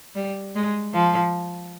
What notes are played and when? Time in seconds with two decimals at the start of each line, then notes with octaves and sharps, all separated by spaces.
0.15 G3
0.55 G#3
0.93 F3